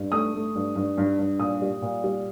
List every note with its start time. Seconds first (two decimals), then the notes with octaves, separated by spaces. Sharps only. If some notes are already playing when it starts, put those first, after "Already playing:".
Already playing: G2
0.12 A3 D#6
0.34 A3
0.55 G2
0.76 G2
0.98 G2
1.19 G2
1.40 A#2 D#6
1.62 G3
1.82 A#2
2.04 G3